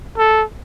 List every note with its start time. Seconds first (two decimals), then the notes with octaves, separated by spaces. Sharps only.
0.18 A4